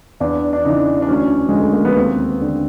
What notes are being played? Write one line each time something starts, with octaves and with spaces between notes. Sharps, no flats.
E2 D4
D4
C#3 E3 D#4
D4
D2 C#4
D3 G#3
A3
A#3
B3
D#2 C4
D3